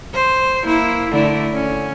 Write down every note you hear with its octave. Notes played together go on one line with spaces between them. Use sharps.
C5
A#3 E4
D3 A3 E4
C#4